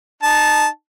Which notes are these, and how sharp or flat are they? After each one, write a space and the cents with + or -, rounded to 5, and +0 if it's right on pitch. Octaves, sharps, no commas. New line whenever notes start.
D#4 -25 A5 -15